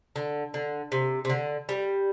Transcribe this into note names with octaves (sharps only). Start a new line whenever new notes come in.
D3
D3
C3
C3
D3
G3